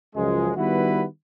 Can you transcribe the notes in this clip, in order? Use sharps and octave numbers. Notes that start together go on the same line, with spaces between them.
C#2 F#2 F3 G#3
D#3 G3 B3 E4 F#4 B4